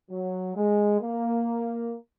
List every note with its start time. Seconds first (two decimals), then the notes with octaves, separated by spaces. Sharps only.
0.11 F#3
0.55 G#3
1.00 A#3